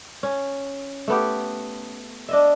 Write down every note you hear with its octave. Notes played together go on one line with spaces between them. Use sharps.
C#4
A3 B3 G4
D4 D#5 E5